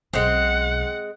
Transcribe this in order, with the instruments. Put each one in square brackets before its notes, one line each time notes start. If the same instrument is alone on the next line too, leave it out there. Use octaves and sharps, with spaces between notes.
[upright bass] B1 B2 [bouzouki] G#3 C4 [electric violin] F#5